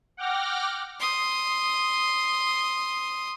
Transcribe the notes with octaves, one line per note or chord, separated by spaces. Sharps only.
F#5 G5 D6 F6 A#6
C6 D#6